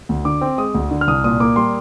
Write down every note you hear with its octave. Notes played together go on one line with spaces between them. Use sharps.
D2
D3 D6
C4
G#3 D#6
D2
D3
F6
C2 D#6
A#2 D#6
A#3 D6
G3 C6